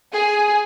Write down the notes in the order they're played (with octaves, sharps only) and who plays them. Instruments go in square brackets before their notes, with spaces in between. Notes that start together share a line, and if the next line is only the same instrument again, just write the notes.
[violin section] G#4